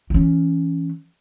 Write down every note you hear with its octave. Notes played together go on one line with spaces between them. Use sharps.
E3 C#4